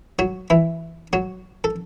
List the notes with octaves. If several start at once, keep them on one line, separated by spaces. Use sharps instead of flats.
F#3 F#4
E3 E4
F#3 F#4
A4